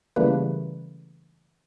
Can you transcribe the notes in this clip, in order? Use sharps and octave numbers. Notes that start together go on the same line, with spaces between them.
C#3 E3 G3 A3 A#3 B4